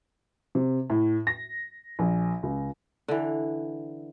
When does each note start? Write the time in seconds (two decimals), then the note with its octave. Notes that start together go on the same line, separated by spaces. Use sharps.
0.55 C3
0.90 A2
1.27 A#6
1.99 A#1
2.43 C#2
3.08 D3 E3